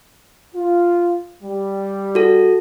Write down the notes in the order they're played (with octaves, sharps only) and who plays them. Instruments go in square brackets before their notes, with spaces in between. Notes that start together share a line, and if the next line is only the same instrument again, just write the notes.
[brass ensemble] F4
G3
[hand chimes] F#4 A4